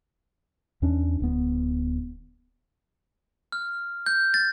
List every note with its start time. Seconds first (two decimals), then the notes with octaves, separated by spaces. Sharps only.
0.82 E2 C#4 D4
1.20 D1 B3
3.52 F6
4.06 G6
4.34 A6